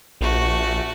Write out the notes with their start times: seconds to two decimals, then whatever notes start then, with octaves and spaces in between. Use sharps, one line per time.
0.21 A#1 A3 F#4